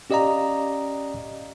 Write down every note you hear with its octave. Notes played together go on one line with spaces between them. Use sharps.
C#4 G4 D5 D#5 F5 A#5